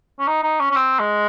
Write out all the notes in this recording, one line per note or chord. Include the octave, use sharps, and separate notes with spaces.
C#4
D#4
D#4
C#4
C#4
C4
G#3